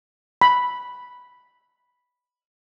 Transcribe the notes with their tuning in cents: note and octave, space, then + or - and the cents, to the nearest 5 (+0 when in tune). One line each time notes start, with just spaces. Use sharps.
B5 +0